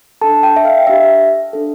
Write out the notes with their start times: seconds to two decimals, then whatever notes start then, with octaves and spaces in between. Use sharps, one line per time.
0.21 D4 A4 A5
0.43 G5
0.56 E5
0.65 F5
0.87 D4 G4 E5
1.53 D4 A4